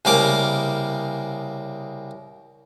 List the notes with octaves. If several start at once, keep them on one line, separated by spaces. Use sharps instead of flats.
C2 C#3 A#3 A#4 D6